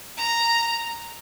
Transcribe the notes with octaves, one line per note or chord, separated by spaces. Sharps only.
A#5